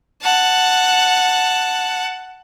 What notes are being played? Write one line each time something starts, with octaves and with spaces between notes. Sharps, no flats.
F#5 A5